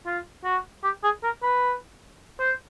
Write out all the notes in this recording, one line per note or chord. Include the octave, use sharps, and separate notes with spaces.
F4
F#4
G4
G#4
A#4
B4
C5